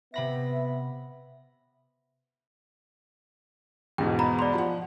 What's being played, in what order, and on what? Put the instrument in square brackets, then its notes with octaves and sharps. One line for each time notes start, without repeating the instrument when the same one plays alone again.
[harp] C3 B5 A#6 [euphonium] B3 [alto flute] E5
[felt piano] E2 G#2 B2 [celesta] G5
[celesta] A#5 B5
D5 C6
[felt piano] F3 F#5